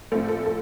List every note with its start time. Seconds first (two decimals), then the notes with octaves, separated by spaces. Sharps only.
0.12 A#1 A2 A3 C4 A4
0.28 A4
0.46 A4